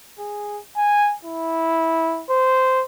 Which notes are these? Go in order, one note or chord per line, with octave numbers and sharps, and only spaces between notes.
G#4
G#5
E4
C5